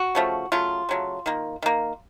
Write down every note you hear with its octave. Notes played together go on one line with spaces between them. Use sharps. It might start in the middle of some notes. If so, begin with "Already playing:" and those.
Already playing: F#4
C#3 F3 A3
C#3 F#3 A3 F4
C#3 F#3 A3
D#3 A#3
D#3 A#3